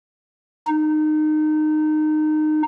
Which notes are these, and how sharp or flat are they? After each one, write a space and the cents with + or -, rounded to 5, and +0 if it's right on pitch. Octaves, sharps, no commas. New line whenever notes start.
D#4 -20